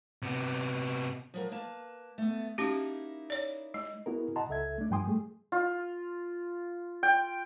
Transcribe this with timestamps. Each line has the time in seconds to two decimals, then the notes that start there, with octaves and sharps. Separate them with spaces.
0.22 C3 B3
1.34 F3 F#3 A#4
1.51 A#3 B4 A5
2.18 A3 B3
2.58 A#3 C#4 D#4 E4 F#4 G4
3.30 C#5 D5
3.74 G#3
4.06 B3 E4 F#4 G#4 A#4
4.36 D#5 F#5 A5 A#5 C6
4.49 C#2 A4 E5 G#6
4.78 A3 D4
4.91 G2 F3 G5 G#5 C6 D#6
5.06 G3 A3 G#4
5.52 F4
7.03 G5